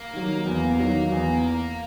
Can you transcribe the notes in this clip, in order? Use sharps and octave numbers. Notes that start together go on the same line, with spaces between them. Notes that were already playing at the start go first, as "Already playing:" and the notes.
Already playing: A#3
D#3 F#3
E2
D#3 F#3
E2